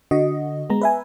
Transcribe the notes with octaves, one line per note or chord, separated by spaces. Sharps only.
D3 F#4 D#5
G#3 B3 A#5
B4 E5 G#5